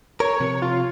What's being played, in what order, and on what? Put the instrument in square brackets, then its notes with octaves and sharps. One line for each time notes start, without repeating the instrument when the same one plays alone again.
[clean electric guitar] A#4 [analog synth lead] C#5
[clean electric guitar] C3 F3
[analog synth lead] F4